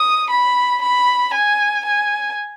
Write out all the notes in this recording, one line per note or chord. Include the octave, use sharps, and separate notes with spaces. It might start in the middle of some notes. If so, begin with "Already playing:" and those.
Already playing: D#6
B5
B5
G#5
G#5